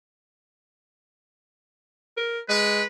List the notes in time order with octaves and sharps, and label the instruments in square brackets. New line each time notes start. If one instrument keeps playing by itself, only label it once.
[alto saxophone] A#4
[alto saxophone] G#3 [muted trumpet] B4